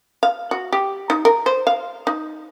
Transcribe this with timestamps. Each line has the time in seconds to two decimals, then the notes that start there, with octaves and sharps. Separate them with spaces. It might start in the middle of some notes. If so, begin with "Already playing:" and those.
0.23 F5
0.51 F#4
0.72 G4
1.10 D#4
1.25 A#4
1.46 C5
1.67 F5
2.07 D#4